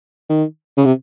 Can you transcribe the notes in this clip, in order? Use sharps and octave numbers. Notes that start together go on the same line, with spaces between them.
D#3
C#3
C3